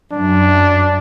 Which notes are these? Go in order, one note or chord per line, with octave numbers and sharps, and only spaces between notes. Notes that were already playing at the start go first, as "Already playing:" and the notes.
F#2 D4